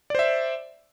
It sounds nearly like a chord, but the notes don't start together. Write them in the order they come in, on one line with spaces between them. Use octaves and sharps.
D5 C5 E5